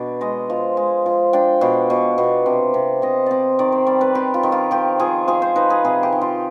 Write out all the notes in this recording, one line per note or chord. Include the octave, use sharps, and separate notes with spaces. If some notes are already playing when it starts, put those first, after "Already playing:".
Already playing: B2 D4
G#3 D#5
F3
G#3
F3
D4 G5
B2 F5
B2
B2
C3
C3
C3 D#5
C4 D5 D#5
D#3 D5
C5
G3 D5
B4
C4 G4
F4
D#3
F4
F3 G4
F3 G#4
F3 G#4
C5
D#4 B4
G#4
C3 G#4
G4
D#3
F4